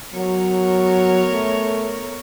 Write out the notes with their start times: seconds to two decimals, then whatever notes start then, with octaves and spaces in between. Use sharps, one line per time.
0.14 F#3 B3 A#4 C#5
1.31 A3